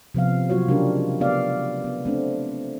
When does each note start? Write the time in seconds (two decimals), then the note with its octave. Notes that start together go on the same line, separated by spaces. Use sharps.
0.14 C3 F3 B3 F5
0.49 F#3 F4 F#4 C#5
0.68 C#3 G#3 D4 G4 A#4
1.20 A3 B3 G4 D5 F5
1.84 B3
2.05 A3 C4 D4